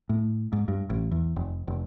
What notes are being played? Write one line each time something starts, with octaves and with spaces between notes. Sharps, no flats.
A2
G#2
G2
A1
E2
F1
F1